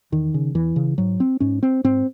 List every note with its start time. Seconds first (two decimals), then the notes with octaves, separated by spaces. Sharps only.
0.12 E2 D#3
0.34 C#3
0.55 E2 E3
0.76 C#3
0.98 G#2 F#3
1.20 C4
1.40 G#2 C#4
1.63 C4
1.84 G#2 C4